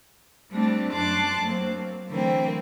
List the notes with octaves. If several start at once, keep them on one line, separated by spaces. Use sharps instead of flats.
G3 A3 C4 D4
F#2 D4 A5 C6 D6 F#6
F#3 A#3 C4
D3 E3 F#3 A3 A#3 C4